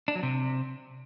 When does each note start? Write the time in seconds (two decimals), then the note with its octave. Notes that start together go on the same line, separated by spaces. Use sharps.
0.08 D4
0.15 F#3
0.23 C3